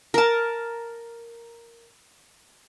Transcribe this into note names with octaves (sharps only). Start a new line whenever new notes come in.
A#4 A5